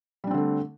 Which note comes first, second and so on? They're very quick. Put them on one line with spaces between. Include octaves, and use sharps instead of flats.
G3 D4 C4 D3 A3